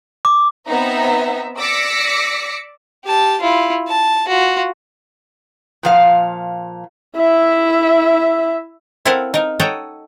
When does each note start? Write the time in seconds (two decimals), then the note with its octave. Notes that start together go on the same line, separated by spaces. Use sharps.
0.25 D6
0.68 B3 C4 D#4 C5 E5 A#5
1.58 D5 D6 E6 A#6 B6 C#7
3.05 G4 A5
3.41 E4 F4
3.88 A5
4.28 F4 F#4
5.83 A#2 F3 F5
7.16 E4 E5
9.05 C4 E4 A4 A#4 F5 F#5
9.34 D#4 A#4
9.60 A4 C#5 D#5 F#5 G5 A#5